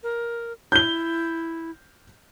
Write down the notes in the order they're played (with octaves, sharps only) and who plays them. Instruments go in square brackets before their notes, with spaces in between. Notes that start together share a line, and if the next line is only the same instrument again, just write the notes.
[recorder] A#4
[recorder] E4 [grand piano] G6 G7